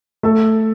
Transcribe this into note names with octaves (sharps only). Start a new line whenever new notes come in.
A3 A4